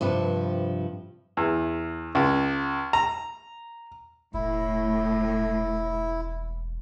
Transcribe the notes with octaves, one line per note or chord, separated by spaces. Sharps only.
G2 C3 F3 B4
E2
C#2
A#5
E1 A2 E4